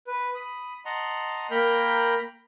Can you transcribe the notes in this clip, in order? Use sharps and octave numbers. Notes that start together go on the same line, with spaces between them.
B4
B5 D#6
D#5 F#5 A5 A#5 C6
A#3 A#4 G5 A#5 B5 G6